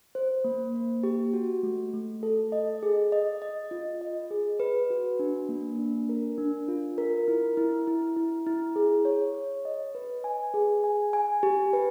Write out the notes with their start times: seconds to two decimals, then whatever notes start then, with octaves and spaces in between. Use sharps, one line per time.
0.15 C5
0.44 A#3
0.74 A#3
1.03 G4
1.34 F#4
1.63 A3
1.93 A3
2.23 A4
2.52 D#5
2.83 G#4
3.12 D#5
3.42 D#5
3.71 F4
4.01 D#5
4.31 G#4
4.60 B4
4.90 F#4
5.19 D4
5.49 A#3
5.79 D4
6.09 A#4
6.38 D4
6.68 F4
6.98 A#4
7.28 E4
7.57 E4
7.87 E4
8.16 E4
8.47 E4
8.76 G#4
9.05 C#5
9.35 C#5
9.65 D#5
9.95 B4
10.24 G#5
10.54 G#4
10.84 G#5
11.13 G#5
11.43 G4
11.73 B4